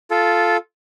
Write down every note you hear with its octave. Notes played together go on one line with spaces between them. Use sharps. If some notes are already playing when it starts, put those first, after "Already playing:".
F4 A4